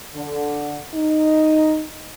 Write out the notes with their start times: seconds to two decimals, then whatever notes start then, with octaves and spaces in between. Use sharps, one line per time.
0.15 D3
0.94 D#4